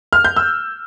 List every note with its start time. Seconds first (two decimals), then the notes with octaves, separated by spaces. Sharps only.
0.13 F6
0.25 G6
0.36 E6